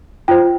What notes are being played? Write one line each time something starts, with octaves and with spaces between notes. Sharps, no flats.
F4 C5 G5